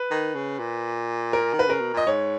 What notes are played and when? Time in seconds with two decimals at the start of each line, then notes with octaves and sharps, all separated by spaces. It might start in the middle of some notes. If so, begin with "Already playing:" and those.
Already playing: B4
0.11 D#3
0.35 C#3
0.59 A#2
1.33 A#4
1.53 D#3
1.59 B4
1.67 C#3 A#4
1.80 B2
1.93 A#2 D#5
2.07 G#2 C#5